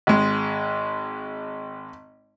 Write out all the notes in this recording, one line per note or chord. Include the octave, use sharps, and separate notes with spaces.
G#1 G#3